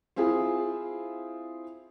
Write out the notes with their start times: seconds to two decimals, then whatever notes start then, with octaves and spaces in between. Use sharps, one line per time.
0.16 C4 E4 F4 G#4